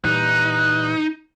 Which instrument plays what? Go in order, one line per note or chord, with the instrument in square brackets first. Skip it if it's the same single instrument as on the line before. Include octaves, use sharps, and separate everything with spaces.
[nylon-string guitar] A#2 E3 G3 [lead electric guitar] D#4 [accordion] F#6